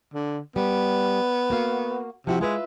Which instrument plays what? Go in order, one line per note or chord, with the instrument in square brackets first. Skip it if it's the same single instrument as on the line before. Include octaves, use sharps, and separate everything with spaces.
[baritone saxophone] D3
[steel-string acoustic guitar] G3 [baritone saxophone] B3
[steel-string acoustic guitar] A#3 F#4 F5
[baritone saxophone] C3 [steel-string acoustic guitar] F3 E4 F#4
[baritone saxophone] G#3 [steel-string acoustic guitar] F4 B4 E5